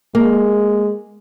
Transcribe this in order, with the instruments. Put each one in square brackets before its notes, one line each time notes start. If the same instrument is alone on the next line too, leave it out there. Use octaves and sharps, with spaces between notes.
[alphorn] G#3 [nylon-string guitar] A#3